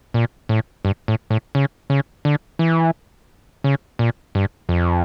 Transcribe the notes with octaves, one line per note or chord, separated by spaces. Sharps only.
A#2
A2
G2
A2
A2
C#3
C#3
D3
E3
C#3
A#2
G2
F2